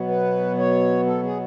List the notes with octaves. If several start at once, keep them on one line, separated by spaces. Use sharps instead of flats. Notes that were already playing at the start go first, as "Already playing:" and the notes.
Already playing: B2 F#3 B3
B4
C#5
A4
G#4